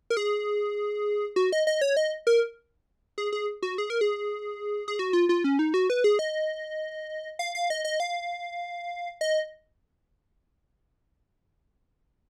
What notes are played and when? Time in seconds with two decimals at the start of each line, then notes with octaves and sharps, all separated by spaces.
0.10 A#4
0.17 G#4
1.36 F#4
1.52 D#5
1.67 D#5
1.81 C#5
1.97 D#5
2.27 A#4
3.18 G#4
3.32 G#4
3.62 F#4
3.78 G#4
3.90 A#4
4.01 G#4
4.88 G#4
4.99 F#4
5.13 F4
5.29 F4
5.44 C#4
5.59 D#4
5.74 F#4
5.90 B4
6.04 G#4
6.19 D#5
7.39 F5
7.55 F5
7.70 D#5
7.85 D#5
8.00 F5
9.21 D#5